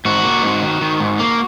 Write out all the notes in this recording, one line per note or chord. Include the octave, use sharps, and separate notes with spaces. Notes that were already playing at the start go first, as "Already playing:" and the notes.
G#2 F#4
A#3
G#2
D#3
D#3
G#2
A#3